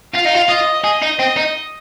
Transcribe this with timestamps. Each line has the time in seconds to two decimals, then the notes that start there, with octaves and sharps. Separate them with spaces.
0.14 F4 F5
0.25 D#4
0.34 F4
0.49 F4 D#5
0.84 G#4 D#5
1.02 D#4
1.20 C4
1.37 D#4